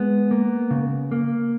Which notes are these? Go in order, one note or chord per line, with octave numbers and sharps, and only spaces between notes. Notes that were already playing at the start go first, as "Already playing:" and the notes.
Already playing: G#3 B3
A#3
C#3
A#3